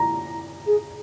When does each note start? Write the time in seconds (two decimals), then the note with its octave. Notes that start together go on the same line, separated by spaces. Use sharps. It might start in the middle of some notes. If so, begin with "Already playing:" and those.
Already playing: A#5
0.66 G#4